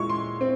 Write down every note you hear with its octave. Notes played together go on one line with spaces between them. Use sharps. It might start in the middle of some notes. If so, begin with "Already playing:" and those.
Already playing: A#2 G#3 E4 C#6
C6
C4